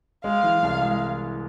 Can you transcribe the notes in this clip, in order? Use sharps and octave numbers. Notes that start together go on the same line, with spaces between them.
G#3 F5
E3
C2
G#3